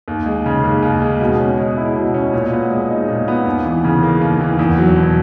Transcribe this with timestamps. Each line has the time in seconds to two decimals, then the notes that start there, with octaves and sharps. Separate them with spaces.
0.08 D#2
0.26 G#3
0.46 C#3
0.64 D#2
0.82 D#2
1.02 G#3
1.21 B2
1.39 C#4
1.58 G#3
1.77 E4
1.96 B2
2.14 C#4
2.33 A#2
2.52 B3
2.71 G#3
2.90 D#4
3.08 A#2
3.28 B3
3.45 D#2
3.65 E3
3.84 C#3
4.03 A#3
4.21 D#2
4.40 E3
4.59 E2
4.78 F#3
4.96 B2